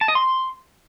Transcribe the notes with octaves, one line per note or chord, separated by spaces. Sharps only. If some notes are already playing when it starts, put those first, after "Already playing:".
A5
D#5
C6